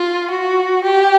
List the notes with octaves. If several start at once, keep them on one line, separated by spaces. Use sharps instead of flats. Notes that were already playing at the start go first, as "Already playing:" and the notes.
Already playing: F4
F#4
G4